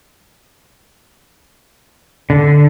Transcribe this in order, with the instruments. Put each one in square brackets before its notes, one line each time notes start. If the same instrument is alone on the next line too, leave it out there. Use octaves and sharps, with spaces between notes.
[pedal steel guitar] D3